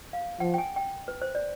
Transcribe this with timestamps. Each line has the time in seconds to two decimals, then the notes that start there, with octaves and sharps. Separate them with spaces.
0.13 F5
0.40 F3 F#5
0.54 G5
0.58 G#5
0.76 G5
1.08 B4
1.22 C5
1.35 D5